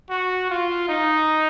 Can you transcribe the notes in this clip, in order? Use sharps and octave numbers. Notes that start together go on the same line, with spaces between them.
F#4
F4
D#4